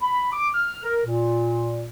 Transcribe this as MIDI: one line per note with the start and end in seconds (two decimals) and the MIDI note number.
0.02 0.32 83
0.33 0.49 86
0.54 0.78 89
0.83 0.99 70
1.05 1.89 46